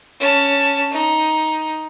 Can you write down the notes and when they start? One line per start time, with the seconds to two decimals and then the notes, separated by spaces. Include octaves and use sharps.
0.19 C#4 A5
0.91 D#4